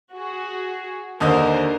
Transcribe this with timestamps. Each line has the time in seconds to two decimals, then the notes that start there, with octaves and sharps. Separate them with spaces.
0.14 F#4 G#4
1.20 D#2 D3 A#4 C5 D#5